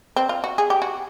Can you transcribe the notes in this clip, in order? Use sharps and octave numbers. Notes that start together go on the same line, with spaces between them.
C4
F4
F#4
G#4
G4
F#4